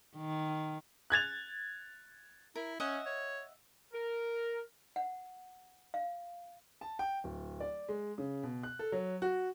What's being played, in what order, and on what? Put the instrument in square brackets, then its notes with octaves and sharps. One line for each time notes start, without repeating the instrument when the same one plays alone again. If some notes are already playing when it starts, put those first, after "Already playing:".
[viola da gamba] D#3
[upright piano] F#6 G#6 A6 F7
[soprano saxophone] E4 [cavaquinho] A#4
[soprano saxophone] C#4 [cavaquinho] D#5 E5 F#5
[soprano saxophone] C#5
[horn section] A#4
[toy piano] F#5
F5
[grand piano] A5
G5
D1
D5
G#3
C#3
B2
F#6
A4
F#3
F#4